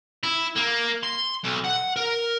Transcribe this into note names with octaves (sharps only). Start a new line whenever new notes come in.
E4
A#3
C6
B1
F#5
A#4